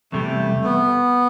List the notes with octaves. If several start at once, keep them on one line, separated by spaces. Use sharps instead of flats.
E2 C3 G3 A3
B3